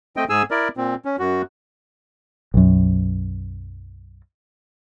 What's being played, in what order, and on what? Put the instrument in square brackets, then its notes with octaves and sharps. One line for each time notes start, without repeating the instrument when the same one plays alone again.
[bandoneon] A3 C4 D#5 G5
G#2 G#4 G#5 E6
E4 A#4 D5
A#2 C4
C#4
F#2 F#4
[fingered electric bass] B1 F#2